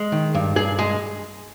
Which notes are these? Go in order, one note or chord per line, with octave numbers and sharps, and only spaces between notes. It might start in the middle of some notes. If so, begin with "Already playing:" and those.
Already playing: G#3
D#3
G2
G2 G#4
G#3 G#4